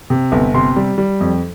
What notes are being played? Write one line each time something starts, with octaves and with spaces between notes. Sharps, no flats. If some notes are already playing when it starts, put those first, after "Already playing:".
C3
G1
C3 C6
G3
G3
F2